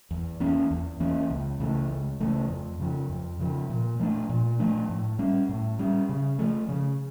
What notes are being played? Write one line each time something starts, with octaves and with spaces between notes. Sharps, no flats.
E2
E3 A#3 C#4
E2
E3 A#3 C#4
C#2
C#3 E3 A3
C#2
C#3 E3 A3
F2
C#3 F3
F2
C#3 F3
A#2
F3 A3 D4
A#2
F3 A3 D4
A2
G3 C#4
A2
G3 C#4
C#3
F3 A3
C#3